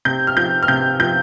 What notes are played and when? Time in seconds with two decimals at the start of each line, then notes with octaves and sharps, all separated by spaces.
0.05 C3 G6
0.27 F6
0.37 F3 G6
0.63 F6
0.68 C3 G6
1.00 F3 G6